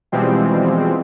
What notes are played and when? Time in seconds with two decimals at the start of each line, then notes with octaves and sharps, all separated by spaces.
0.12 B2 E3 F3 G3 G#3 C4